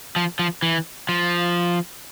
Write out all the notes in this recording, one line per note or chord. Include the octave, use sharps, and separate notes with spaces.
F3
F3
E3
F3